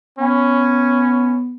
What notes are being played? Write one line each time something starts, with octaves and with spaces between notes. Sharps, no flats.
B3 C#4